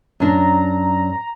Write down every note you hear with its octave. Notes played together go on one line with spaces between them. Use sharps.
F#2 D4 A#5